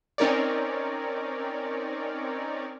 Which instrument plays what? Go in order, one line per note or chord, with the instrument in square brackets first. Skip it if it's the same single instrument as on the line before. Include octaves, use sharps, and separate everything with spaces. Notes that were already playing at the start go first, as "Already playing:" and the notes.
[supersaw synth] C4 C#4 D#4 A#4 C#5 D5